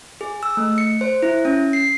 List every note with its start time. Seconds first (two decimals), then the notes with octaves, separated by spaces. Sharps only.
0.21 G#4
0.43 E6
0.57 A3
0.78 C#7
1.01 C5
1.22 E4
1.45 C#4
1.73 C7